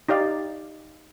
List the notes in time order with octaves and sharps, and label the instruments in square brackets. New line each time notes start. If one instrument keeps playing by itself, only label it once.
[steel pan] D#4 G4 D5 F5